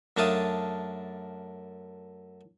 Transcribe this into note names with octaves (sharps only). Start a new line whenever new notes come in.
F#2 A3 D4 F5 A5 D#6